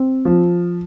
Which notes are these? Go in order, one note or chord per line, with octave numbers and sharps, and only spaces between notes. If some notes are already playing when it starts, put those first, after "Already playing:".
Already playing: C4
F3